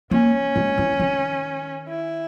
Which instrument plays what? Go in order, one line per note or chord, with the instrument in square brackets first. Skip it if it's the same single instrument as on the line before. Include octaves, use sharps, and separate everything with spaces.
[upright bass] A#3 [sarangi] C#4
[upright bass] G#3
E3
D#3
[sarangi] E4